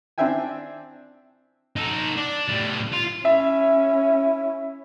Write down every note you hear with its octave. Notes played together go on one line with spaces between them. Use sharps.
C4 D4 E4 E5 G5 G#5
D#4 A4
D4
A2 G3
F4
C#4 E4 E5